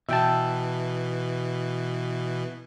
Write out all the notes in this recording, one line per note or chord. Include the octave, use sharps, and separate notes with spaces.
B2 E3 E5 G5 A5